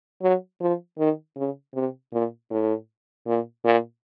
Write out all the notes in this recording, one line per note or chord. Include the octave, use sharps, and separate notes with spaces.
F#3
F3
D#3
C#3
C3
A#2
A2
A#2
A#2